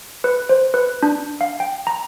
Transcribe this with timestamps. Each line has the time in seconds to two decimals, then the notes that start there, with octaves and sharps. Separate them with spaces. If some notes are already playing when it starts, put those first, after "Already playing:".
0.24 B4
0.49 C5
0.74 B4
1.03 D4
1.41 F5
1.60 G5
1.87 A#5